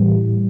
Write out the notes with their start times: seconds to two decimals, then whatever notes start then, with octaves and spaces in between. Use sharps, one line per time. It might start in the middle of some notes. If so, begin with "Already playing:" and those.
Already playing: A2 E3 G3